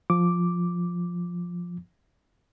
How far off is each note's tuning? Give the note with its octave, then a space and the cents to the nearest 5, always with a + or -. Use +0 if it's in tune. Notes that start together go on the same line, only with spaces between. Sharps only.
F3 +5 D6 +0